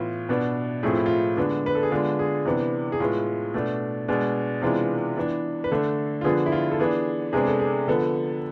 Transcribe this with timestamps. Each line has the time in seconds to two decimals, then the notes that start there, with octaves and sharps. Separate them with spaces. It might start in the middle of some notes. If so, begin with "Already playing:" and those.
Already playing: A2 E3 B3 F4
0.29 B2 B3 D4
0.83 A2 F3 A3 C4 G#4
0.91 F4
0.97 E4
1.06 F4
1.37 D3 G#3 B3 D4
1.66 B4
1.75 A4
1.83 G#4
1.91 D3 G#3 B3 D4 F4
2.19 G#4
2.45 C3 E3 B3 D4
2.92 G#4
3.00 A2 G#3 B3 F4
3.54 B2 A3 D4
4.08 B2 G#3 D4
4.62 C3 E3 G#3 B3 D4 F4
5.17 E3 B3 D4
5.64 B4
5.71 D3 A3 D4 A4
6.21 F4
6.24 D3 F3 B3 D4 G#4
6.46 E4
6.52 F4
6.72 A4
6.79 E3 B3 D4 G#4
7.33 C3 G#3 B3 D4 G#4
7.47 A4
7.59 G#4
7.88 D3 F3 B3 A4